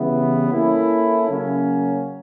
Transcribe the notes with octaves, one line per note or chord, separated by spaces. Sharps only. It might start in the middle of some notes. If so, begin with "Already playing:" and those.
Already playing: C#3 E3 G3 B3 E4
A#3 C#4 E4 A4
C#3 F#3 A#3 C#4